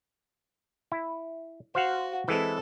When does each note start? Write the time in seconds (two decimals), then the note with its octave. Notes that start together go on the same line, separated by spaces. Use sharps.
0.92 E4
1.75 F#4 C5 F5 F#5
2.28 E3 G#3 C4 E4 A4